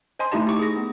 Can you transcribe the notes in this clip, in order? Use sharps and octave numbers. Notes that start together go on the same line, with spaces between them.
C5 D#5 G#5 A5 C6
A3 D#4 E4 G4 D#5 A5
D#4 E4 C#6 D6
G#4 A#6
B3